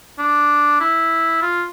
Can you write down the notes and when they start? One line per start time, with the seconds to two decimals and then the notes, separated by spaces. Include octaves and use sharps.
0.19 D4
0.81 E4
1.42 F4